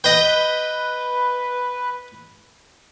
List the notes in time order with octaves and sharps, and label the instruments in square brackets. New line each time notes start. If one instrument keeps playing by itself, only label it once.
[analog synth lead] B4 [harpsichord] D#5 G5